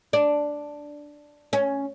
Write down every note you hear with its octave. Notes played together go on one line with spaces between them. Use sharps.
D4
C#4